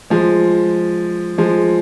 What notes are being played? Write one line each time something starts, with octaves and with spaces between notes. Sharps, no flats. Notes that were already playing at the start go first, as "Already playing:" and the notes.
F3 G#3
F3 G#3